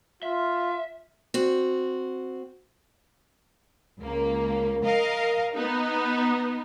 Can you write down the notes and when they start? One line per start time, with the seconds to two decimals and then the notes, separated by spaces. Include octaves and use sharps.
0.23 F4 E5
1.34 C4 F#4
3.99 C#2 A#3
4.85 A#4 D#5 F5
5.54 B3 D#4